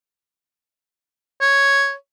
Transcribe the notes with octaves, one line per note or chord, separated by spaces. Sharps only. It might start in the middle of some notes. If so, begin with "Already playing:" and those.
C#5